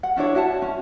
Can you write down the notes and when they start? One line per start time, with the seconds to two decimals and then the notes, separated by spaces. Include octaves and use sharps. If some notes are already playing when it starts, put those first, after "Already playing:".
0.03 F#5
0.16 C#4 D4 E4 C#5
0.35 F#4 E5 F#5 A5
0.62 C#4